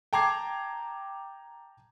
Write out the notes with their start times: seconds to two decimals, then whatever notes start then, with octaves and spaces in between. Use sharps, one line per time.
0.13 G5 A5 A#5 D6 G#6 C7